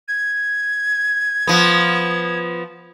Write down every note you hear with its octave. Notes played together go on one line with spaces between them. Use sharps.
G#6
F3 B3